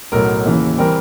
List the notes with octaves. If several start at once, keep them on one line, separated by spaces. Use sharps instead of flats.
B1 A2 F#3 A#4
D#2 C#3 E3
E3 G3 C4 A#4